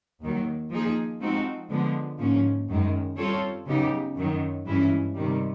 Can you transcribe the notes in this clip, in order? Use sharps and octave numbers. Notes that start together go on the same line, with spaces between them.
D#2 D#3 F#3
F3 A#3 D#4 G#4
F3 G#3 C4 D#4 F#4
D3 F3 G#3 B3
G#2 F3 A#3 C#4
F#2 D#3 G#3
G3 C4 F4 A4 C#5
C#3 F#3 B3 D#4 G4
F#2 D#3 F#3
G2 E3 G#3 C#4 E4
C3 D#3 G3